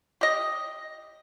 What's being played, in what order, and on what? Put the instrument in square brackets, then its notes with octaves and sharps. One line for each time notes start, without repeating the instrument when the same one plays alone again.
[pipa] G4 D#5